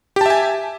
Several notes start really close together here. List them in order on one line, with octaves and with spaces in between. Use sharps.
G4 A5 E5 G#5